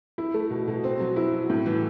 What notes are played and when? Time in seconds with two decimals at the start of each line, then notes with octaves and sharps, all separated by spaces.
0.18 E4
0.34 A3
0.50 B2
0.68 B2
0.84 C4
1.00 F#3
1.16 E4
1.33 F#3
1.50 A2
1.66 E3